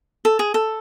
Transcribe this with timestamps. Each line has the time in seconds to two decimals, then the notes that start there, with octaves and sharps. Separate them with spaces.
0.25 A4
0.39 G#4
0.54 A4